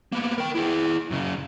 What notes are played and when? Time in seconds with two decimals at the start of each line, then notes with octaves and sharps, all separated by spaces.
0.12 A#3 B3
0.38 A#4 G5
0.55 E4 G#4
1.11 F#2 C#3